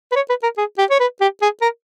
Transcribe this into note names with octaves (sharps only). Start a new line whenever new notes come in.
B4
C#5
B4
A#4
G#4
G4
C#5
B4
G4
G#4
A#4